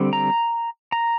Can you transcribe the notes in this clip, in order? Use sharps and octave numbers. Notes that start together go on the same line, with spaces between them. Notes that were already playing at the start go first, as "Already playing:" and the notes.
Already playing: D3 G3 C4
A#5
A#5